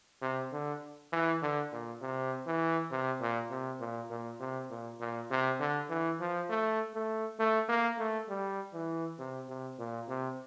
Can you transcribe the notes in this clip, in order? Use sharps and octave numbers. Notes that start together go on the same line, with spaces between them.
C3
D3
E3
D3
A#2
C3
E3
C3
A#2
C3
A#2
A#2
C3
A#2
A#2
C3
D3
E3
F3
A3
A3
A3
A#3
A3
G3
E3
C3
C3
A#2
C3